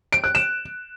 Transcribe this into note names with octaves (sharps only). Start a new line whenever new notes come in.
D7
F#6
E7